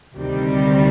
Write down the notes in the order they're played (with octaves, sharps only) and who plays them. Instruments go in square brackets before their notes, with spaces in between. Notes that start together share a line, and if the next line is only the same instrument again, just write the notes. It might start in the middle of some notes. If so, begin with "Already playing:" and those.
[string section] D2 C3 D#3 G3